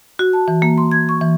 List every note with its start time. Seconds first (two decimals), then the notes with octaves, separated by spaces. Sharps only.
0.19 F#4
0.33 A5
0.48 E3
0.62 A#3
0.78 C6
0.91 G#6
1.09 C#6
1.21 E3